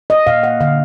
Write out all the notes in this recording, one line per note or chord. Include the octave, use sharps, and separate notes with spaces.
D#5
A#2 F5
F#5
D3 F5